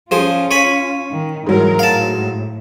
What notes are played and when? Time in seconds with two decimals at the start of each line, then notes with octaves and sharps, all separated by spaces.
0.11 F3 C#4 F4 G#4 C5
0.51 C#5 G#5 B5
1.11 D#3
1.47 G#2 E3 F#3 A#4
1.79 A2 F5 A5